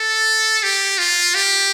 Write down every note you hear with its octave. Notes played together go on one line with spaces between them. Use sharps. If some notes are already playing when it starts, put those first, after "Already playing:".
Already playing: A4
G4
F4
G4